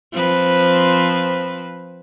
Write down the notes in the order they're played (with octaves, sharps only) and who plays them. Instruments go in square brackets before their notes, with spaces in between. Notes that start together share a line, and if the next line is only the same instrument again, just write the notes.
[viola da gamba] F3 C4 B4